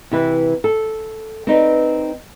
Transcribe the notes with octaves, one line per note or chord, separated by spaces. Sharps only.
C3 E3 E4 B4
A4
C4 D#4 B4 D5